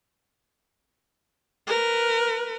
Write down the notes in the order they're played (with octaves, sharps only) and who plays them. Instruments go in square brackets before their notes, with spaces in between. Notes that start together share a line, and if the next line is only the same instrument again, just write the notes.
[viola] A#4 B4